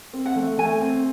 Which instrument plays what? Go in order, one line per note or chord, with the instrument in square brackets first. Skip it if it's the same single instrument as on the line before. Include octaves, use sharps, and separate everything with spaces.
[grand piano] C4
[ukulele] F#5
[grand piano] A3
[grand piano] A3 [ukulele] G#5
[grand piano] C4